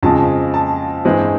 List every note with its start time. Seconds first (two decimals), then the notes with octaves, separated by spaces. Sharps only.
0.03 F2 C#3 F3 G#3 A5
0.54 A5
1.05 G2 E3 G#3 C4